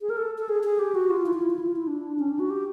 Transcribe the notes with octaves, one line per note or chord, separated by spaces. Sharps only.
G#4
A#4
A4
A4
G#4
G#4
G4
F#4
F4
E4
F4
E4
F4
E4
F4
E4
D4
C#4
D4
F#4
G4